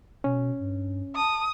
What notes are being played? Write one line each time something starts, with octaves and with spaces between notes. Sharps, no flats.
B2 C#4
G2
A5 D#6